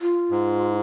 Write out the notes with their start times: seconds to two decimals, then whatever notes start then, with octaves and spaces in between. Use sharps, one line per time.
0.01 F4
0.31 G#2